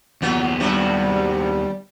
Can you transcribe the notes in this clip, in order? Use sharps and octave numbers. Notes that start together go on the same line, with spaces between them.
D#2 F#3 B3 F4
G2 C3 G3 F#4